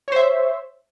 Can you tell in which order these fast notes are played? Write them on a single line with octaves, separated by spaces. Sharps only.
C#5 C5 E5